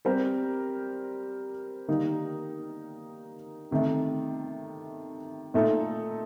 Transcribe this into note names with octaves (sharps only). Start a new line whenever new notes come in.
G3 C4 G4 A#4
D#3 G3 A#3 D#4 A#4
C3 D#3 A3
A#2 A3 D#4 A4